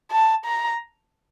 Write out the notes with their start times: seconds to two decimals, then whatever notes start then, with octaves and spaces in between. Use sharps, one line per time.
0.11 A5
0.45 A#5